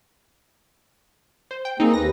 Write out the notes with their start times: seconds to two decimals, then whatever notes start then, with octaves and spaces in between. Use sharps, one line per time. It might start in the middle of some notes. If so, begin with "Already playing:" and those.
1.51 C5
1.65 G5
1.80 A#3 C4 D#4 G#4
1.94 D#2 B4 A#6